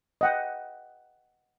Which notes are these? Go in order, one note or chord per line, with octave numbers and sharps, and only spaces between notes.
D#5 F#5 G5